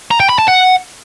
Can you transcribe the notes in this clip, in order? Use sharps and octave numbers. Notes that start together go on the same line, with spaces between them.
A#5
G5
B5
A5
F#5